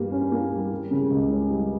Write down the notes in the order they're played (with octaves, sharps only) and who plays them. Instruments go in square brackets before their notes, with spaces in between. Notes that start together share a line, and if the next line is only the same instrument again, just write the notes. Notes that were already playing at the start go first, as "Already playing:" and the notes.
Already playing: [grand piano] G2 G3 A#3
C#4
A#3
G3
G3
C#3
C#2
C#4
G3